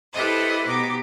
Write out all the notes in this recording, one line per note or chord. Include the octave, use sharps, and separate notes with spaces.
E4 G4 A4 B4 C5 D#5
B2 D#4 G4 D6